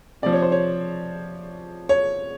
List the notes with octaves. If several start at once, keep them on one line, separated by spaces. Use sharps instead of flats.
C3 F3 D5
C#5
C5
C#5
C#5